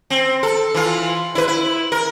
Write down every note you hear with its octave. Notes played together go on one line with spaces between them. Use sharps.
C4
A4
E3 F4
E4 B4
E4
A#4